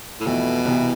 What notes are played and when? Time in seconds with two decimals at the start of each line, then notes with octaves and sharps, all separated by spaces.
0.20 A2
0.26 F2 B2 E3 A3 E4
0.65 C2 C3 E3 B3